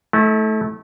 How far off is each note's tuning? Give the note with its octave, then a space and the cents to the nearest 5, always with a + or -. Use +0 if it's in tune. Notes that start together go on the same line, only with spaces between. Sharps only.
A3 -15 E4 -40